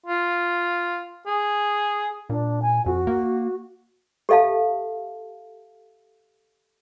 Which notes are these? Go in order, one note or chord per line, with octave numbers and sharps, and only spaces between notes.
F4
G#4
A#2 D4
G#5
F2 F#4
A#3
G4 A4 E5 F5 A5